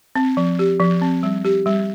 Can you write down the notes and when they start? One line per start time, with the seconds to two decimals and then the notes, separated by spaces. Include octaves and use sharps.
0.16 C4
0.37 F3
0.59 G4
0.80 F3
1.02 C4
1.23 G3
1.45 G4
1.66 G3